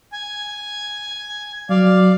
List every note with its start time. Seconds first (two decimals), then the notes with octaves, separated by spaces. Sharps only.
0.12 G#5
1.70 F#3 D5 F5